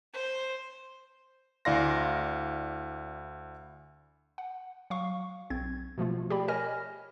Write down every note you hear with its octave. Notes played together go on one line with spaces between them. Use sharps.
C5
D2 E4 D5 F5 C6 A#6
F#5
F#3 F5 C#6
B1 C4 G#6
B2 F3 A3 F4
G4 G#4 D5 G5 B5
A#4 C#5 D#5 G#5 F6 A#6